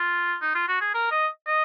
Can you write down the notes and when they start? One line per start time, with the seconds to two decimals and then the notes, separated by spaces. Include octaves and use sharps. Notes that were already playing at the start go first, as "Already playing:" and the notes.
Already playing: F4
0.41 D#4
0.55 F4
0.68 F#4
0.81 G#4
0.94 A#4
1.11 D#5
1.47 D#5